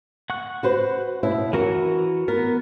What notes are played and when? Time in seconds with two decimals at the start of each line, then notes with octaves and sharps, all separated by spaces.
0.30 F#5 C#6 F#6
0.63 F#4 B4 C5
1.23 B2 C#4 E4
1.53 E3 F#4 A#4 F#5
2.28 B3 A#4